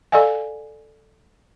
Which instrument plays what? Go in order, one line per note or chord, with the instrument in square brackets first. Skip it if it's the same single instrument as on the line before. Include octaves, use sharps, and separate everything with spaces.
[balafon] A4 D5 D#5 F5 G#5